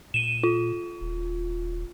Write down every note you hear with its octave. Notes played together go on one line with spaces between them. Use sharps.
A#2 D#7 E7
F4
D#1